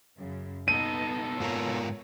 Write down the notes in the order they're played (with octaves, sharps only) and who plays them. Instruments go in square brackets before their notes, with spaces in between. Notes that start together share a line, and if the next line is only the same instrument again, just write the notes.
[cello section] F#2 C#3
[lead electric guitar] B2 A4 [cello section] B3 D#4 [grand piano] D#7
[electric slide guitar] G#2 F4 A#4 [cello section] C#5